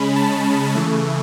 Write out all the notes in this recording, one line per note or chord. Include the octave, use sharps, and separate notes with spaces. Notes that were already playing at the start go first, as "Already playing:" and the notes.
Already playing: C#3 G#3 C#4 B5
A5
A5
C#3 E3 A3